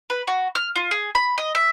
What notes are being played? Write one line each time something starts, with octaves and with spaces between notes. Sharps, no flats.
B4
F#4
F6
F4
G#4
B5
D#5
E5